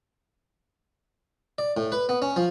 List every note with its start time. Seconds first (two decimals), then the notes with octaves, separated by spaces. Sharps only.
1.58 D5
1.77 A2
1.92 B4
2.09 B3
2.22 C#4
2.36 F3